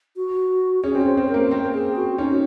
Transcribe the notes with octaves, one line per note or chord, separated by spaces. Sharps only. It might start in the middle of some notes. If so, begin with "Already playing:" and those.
F#4
C#4 G#4
C4
C#4
C5
C4
A#4
A#3
C4
G#4
F#4
C#4 D#4